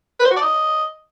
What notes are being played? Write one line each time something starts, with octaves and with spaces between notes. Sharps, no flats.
B4
C5
F#4
D5
D#5